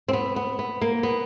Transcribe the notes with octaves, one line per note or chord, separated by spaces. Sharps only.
C4
B3
B3
B3
A#3
B3